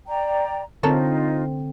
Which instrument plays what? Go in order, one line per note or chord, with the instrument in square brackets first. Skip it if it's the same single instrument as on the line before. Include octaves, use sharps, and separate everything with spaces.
[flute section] D5 G5 A#5
[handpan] D3 C4 [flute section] D#4 F4 [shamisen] A4 A#4 C#5